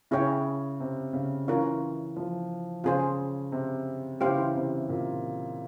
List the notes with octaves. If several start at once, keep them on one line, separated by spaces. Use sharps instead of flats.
C#3 E4 G#4 C#5 G5
C3
C#3
E3 C#4 F4 A#4 C#5 F5
F3
C#3 F4 G#4 C5
C3
C#3 E4 G4 C5 F5
E3
C3
A#2